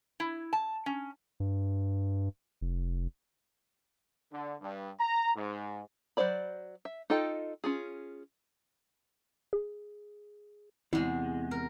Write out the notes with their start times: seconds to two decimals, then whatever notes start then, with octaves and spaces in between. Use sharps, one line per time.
0.20 E4
0.53 A5
0.86 C#4
1.40 G2
2.61 F1
4.33 D3
4.62 G2
5.00 A#5
5.36 G#2
6.17 F#3 A#3 C5 D5 B5
6.85 E5
7.10 D#4 F4 A4 D#5 G5
7.64 C#4 F4 G#4
9.53 G#4
10.93 E2 C3 G#3 E4
11.51 A#4